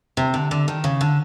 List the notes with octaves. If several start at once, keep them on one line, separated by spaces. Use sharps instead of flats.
C3
D3
D3
D#3
C#3
D3